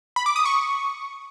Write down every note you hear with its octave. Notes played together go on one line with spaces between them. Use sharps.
B5
D6
D#6
C#6